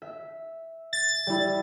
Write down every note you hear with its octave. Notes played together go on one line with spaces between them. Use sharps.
E5
A6
G3 E4